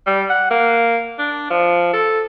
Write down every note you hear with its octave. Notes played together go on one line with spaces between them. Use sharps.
G3
F#5
A#3
D4
F3
A4